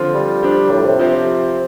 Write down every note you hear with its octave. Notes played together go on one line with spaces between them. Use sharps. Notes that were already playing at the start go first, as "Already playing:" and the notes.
Already playing: D3 F3 C4 F4
G3
F3 D4 G4
A2
C3
F3 C4 G4